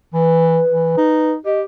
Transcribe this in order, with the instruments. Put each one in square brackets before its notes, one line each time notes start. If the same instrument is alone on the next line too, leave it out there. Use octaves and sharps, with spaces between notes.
[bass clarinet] E3 [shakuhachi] B4
[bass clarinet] E3
D#4
[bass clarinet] G4 [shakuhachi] D#5